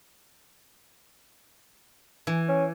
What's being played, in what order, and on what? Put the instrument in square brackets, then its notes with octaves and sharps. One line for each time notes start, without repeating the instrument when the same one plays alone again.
[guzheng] E3
[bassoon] C#4